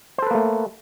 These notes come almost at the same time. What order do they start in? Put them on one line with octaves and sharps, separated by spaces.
C5 A4 B4 A#3 A3